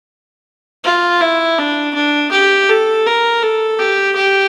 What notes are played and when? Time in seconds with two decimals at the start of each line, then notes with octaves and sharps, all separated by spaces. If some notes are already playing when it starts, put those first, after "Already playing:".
0.84 F4
1.21 E4
1.58 D4
1.94 D4
2.32 G4
2.69 A4
3.06 A#4
3.43 A4
3.79 G4
4.16 G4